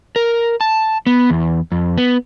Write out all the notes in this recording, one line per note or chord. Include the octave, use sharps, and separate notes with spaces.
A#4
A5
B3
E2
F2
B3